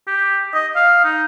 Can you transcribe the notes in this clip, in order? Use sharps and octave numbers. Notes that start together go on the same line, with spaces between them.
G4
D#5
F5
D#4